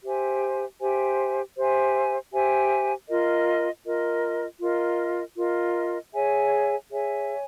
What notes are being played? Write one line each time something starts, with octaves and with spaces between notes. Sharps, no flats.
G4 C5 E5 G#5
G4 C5 E5 G#5
G4 C5 E5 G#5
G4 C5 E5 G#5
F4 A#4 D#5
F4 A#4 D#5
F4 A#4 D#5
F4 A#4 D#5
G#4 C#5 E5 G#5
G#4 C#5 E5 G#5